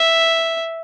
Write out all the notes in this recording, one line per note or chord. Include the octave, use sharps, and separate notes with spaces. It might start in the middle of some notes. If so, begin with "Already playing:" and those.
Already playing: E5